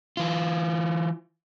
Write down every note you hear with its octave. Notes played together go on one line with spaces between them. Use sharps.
E3 F4